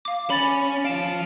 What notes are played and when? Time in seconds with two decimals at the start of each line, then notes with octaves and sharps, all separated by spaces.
0.05 F5 D6
0.30 C#4 B5 A6
0.85 F3 F5 D7 E7